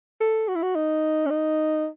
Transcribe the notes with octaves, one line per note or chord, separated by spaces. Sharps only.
A4
F#4
E4
F#4
D#4
C#4
D#4